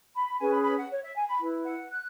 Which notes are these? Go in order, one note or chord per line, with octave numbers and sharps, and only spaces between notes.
B5
C#4 G#4 B4 G#5
B5
B5
F#5
C#5
E5
G#5
B5
E4 B4
F#5
F#6